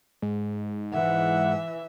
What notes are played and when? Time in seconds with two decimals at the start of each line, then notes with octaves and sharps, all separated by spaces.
0.22 G#2
0.93 E3 E5 F#5